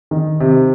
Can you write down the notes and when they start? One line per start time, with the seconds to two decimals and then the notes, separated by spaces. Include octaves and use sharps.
0.11 D#3
0.40 C3